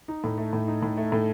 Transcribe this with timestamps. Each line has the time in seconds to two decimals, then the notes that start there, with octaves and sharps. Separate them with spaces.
0.08 D#4
0.24 A2
0.38 A3
0.53 A2
0.68 D#4
0.83 A2
0.97 A3
1.12 A2